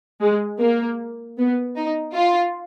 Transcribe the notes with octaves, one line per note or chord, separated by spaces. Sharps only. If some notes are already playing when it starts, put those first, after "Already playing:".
G#3
A#3
B3
D#4
F4